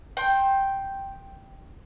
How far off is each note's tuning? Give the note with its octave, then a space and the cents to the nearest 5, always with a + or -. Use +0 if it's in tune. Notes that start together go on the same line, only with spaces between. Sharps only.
G5 +0 C6 +25